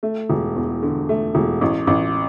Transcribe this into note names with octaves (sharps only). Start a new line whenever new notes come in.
A3
E1
E2
D3
A3
E1
A1
A1